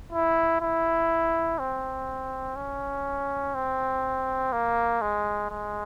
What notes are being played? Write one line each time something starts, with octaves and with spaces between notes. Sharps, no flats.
E4
E4
C4
C#4
C4
A#3
G#3
G#3